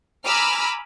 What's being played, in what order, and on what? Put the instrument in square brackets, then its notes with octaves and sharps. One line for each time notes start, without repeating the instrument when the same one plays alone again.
[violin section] G#5 A#5 B5 D6 E6 F6